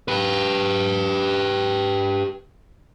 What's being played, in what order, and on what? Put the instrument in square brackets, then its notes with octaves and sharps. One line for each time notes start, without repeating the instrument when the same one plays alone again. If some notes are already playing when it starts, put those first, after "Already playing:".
[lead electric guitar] G4 B4